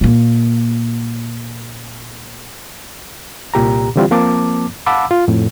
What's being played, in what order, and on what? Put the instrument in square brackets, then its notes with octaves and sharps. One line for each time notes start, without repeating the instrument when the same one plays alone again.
[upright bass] A#2 A#3
[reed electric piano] C2 A#2 G4 A#5
D3 E3 G3 C4 F4 G4
F3 A#3 C4 A5 D6
F5 F#5 A5 B5 D6 E6
F4
F2 A2